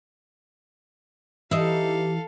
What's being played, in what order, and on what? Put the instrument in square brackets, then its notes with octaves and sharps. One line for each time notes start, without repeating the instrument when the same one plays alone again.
[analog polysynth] E3 [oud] D#4 E4 [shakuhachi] G4 [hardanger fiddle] A4 F5